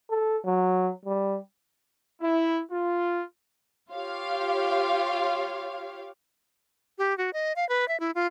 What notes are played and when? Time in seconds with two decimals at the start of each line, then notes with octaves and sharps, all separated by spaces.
0.10 A4
0.45 F#3
1.05 G3
2.21 E4
2.70 F4
3.90 F4 G4 C#5 F5
6.98 G4
7.18 F#4
7.33 D#5
7.56 F5
7.69 B4
7.88 E5
8.00 E4
8.15 F4